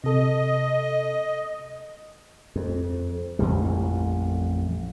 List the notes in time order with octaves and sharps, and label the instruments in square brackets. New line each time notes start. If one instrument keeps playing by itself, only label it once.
[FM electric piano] C3 A4 [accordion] D#5
[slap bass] F2
A1 F2 A#2 G3